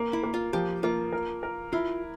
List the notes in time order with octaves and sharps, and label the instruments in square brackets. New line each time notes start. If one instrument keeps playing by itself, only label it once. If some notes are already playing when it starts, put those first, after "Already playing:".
Already playing: [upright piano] A#3
[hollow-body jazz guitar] E4
[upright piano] A#3
[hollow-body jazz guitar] F4
[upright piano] F3 [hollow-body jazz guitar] G4
[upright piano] A#3 [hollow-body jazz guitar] F4
[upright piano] A#4
A#4
[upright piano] E4 [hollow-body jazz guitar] F4